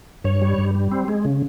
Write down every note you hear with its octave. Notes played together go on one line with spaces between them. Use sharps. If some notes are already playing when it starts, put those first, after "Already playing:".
G2 C#5
G3
G2
G3
C4
G#3
C#3